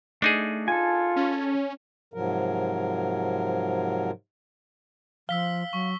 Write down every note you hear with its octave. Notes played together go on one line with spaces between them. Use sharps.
A3 D4 D#4 G#4
F4 A4 G#5
C#4
G#2 C3 F3 F#3 A#4
F3 F5 E6 B6 G7
F#3 C#6 B6